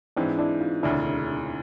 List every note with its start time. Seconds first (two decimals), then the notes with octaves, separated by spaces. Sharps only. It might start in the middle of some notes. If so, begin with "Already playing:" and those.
0.17 G#2 E3 G#3 C4 D4
0.39 D4 E4
0.61 D#4 F4
0.83 E1 D2 C#3 D4 E4